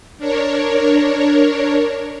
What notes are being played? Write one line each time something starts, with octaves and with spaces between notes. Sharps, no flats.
D4 A#4 C#5